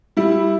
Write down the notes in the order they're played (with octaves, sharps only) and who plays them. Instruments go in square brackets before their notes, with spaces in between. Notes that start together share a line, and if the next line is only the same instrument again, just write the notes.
[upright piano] G3 [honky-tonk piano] E4